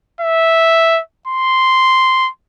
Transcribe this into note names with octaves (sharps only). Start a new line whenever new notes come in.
E5
C6